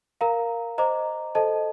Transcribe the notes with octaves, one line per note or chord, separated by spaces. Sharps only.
A#4 F5 A#5
C5 D#5 A#5 D6
A4 C5 D#5 A5